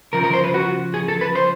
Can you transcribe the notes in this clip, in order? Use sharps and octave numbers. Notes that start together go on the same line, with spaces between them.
C#3 F3 A#4
A#4
C5
B4
F#4
G#4
A4
B4
C5